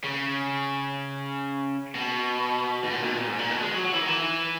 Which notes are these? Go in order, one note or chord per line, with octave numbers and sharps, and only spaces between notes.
C#3
B2
G#2
A#2
B2
A#2
G#2
A#2
B2
G#3
F#3
F#3
E3
D#3
E3